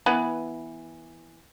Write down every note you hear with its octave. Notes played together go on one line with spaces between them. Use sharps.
E3 B3 B4